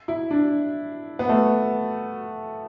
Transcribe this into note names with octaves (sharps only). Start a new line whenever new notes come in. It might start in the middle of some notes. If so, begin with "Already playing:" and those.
E4
D4
B3
A3